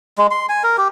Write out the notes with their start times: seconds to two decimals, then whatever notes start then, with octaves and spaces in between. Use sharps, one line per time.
0.18 G#3
0.31 C6
0.49 G#5
0.64 A#4
0.78 G4